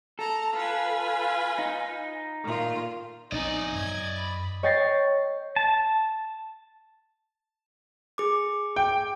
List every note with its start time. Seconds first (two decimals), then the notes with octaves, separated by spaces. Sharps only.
0.19 A4 A5 A#5
0.54 F4 B4 G#5
1.59 D#4
2.44 A#2 D#3 F4
3.32 A#1 B3 C4 D#4 D5 D#5 G#5
3.75 F#2 G#6
4.16 B5
4.63 C#5 D#5 G5 A6 A#6 C7
5.56 A5
8.18 G#4 D6
8.76 G5